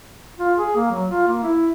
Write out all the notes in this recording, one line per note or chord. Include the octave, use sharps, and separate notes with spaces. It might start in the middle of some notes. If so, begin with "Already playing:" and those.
F4
G#4
A#3
F#3
F4
A#3
E4